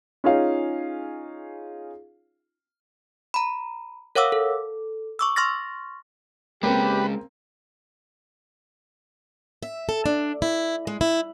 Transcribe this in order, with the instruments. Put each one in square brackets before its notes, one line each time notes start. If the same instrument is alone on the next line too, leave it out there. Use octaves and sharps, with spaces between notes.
[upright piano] C#4 D#4 F4 G#4 C#5 F5
[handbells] A#5 B5
A#4 C#5 F5 F#5 D6 E6
A4
C#6 D6 E6
C6 C#6 F6 A6 A#6
[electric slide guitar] G#3 C#4 [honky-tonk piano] A#3 C4 [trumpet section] G4 [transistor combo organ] B4
[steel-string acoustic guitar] E5
A4
D4
E4
G#3
E4